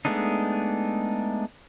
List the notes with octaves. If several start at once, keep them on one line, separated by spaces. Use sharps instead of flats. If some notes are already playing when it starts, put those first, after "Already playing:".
G#3 A3 B3 D4 D#4